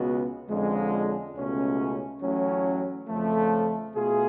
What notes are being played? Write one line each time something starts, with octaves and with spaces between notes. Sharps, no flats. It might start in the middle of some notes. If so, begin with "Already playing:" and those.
Already playing: C#2 B2 G#3 B3 F#4
F2 D3 G#3 C#4 F4
C#2 B2 A3 C#4
A1 A2 F#3 C#4
F2 C#3 F3 A3
B2 A3 F4 G#4